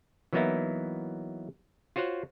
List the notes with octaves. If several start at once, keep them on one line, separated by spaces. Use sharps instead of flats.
E3 F#3 A#3 B3 D#4 E4
F4 F#4 C5 C#5 F#5